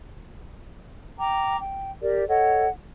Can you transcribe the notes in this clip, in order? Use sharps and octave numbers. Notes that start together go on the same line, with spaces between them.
G5 A#5 D6
G5
G4 A#4 D5
A4 C#5 D#5 F#5